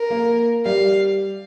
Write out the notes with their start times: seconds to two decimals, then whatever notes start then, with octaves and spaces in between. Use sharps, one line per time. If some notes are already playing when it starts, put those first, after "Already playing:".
Already playing: A#4
0.10 A#3
0.65 G3 F5